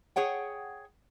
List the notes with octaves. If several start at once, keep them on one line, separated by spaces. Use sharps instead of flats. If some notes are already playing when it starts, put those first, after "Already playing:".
G#4 C#5 F#5 G5